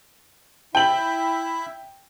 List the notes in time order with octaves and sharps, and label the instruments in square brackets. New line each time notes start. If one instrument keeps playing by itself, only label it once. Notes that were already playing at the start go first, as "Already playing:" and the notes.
[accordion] E4 E5 [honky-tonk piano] G5 F#7